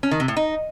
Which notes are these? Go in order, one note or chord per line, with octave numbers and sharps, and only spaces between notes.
C#4
D#3
C3
A2
D#4